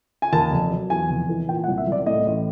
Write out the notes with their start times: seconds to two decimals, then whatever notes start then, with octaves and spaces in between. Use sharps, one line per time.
0.22 G#5
0.33 D#2 A5
0.51 F1
0.71 F#3
0.90 E2 G#5
1.10 F1
1.29 E3
1.49 A#2 G5
1.64 F#5
1.68 C2
1.78 E5
1.87 C2 D5
2.06 A2 D#5
2.26 A1